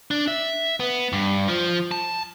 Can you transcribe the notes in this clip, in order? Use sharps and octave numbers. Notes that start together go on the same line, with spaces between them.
D4
E5
B3
G2
F3
A5